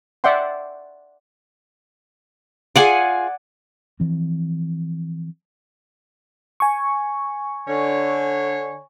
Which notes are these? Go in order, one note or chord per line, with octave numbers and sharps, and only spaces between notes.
D5 E5 F#5 G5 C6
F4 G#4 D5 F#5 G#5
E3 F3 C4
G#5 C#6
D3 C#5